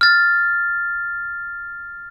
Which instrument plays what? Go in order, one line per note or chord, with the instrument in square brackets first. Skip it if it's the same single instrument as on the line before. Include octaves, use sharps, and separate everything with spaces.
[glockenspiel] F6 A6